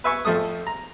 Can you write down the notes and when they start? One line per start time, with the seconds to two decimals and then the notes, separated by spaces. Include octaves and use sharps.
0.04 B4 E5 G#5 C#6
0.25 F2 F3 A3 A4 D#6
0.67 A#5